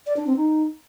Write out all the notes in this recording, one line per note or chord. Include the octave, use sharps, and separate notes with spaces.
D5
D4
C4
D#4